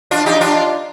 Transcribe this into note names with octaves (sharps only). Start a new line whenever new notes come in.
D4 F4
D#4 G4
D4 F4